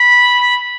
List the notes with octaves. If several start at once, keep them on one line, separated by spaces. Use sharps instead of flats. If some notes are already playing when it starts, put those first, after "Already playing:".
Already playing: B5